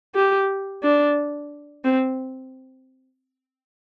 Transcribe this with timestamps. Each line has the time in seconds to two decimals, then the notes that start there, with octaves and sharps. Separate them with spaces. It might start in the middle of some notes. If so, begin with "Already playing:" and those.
0.15 G4
0.83 D4
1.85 C4